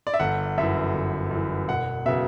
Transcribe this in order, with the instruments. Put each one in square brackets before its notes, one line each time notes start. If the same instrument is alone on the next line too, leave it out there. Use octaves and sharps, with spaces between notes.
[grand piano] D5
E5
G1 F#5
F#2 E3 E5
G1
F#2 E3
E1 F#5
C#3 F#3 B3 E5